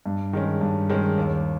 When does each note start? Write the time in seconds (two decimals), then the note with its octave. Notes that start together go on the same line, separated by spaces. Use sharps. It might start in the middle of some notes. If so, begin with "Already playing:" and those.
0.06 G2
0.33 D#3 G#3 C#4
0.61 G2
0.90 D#3 G#3 C#4
1.18 D#2